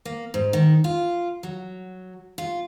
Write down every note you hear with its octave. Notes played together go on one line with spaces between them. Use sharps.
A#3
G#2
D#3
F4
F#3
F4